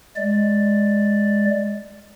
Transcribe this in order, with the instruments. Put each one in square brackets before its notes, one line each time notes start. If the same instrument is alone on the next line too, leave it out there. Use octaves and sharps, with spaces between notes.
[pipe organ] G#3 D5